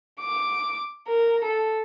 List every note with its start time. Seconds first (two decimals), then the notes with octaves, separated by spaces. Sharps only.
0.21 D6
1.07 A#4
1.44 A4